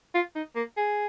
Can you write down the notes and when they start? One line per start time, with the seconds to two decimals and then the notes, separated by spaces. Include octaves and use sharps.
0.15 F4
0.35 D#4
0.56 A#3
0.77 G#4